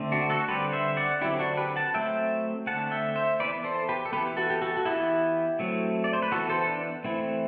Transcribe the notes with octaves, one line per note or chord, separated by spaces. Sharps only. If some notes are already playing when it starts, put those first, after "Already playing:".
Already playing: D3 A3 C4
D4 F#4
F#4 A4
D3 G3 C4 G4 B4
C5 E5
D5 F#5
D3 F#3 C4 E4 G4
D4 F#4
G4 B4
F#5 A5
F#3 A3 C4 E5 G5
D3 A3 C4 F#5 A5
E5 G5
C5 E5
E3 B3 B4 D5
A4 C5
G4 B4
A4
E3 B3 G4 B4
F#4 A4
G4
F#4 A4
F#4
E3 B3 E4 G4
F#3 A3 C4
D5
C5
B4
E3 B3 F#4 A4
A4 C5
D4
E3 A3 C4 E4